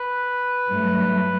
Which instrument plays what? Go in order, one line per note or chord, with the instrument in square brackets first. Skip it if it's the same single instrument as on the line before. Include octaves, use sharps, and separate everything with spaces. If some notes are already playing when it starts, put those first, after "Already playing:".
Already playing: [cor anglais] B4
[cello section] G2 F#3 A3